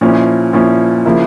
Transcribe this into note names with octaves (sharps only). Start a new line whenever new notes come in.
A#2 F3 C#4 E4
A#2 F3 C#4 E4
C#3 F3 A#3 E4